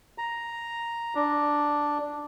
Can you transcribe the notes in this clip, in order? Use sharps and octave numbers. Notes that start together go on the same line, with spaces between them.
A#5
D4